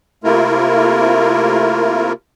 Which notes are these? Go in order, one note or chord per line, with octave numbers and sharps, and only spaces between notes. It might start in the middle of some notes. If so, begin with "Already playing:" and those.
C3 A3 A#3 E4 F4 A#4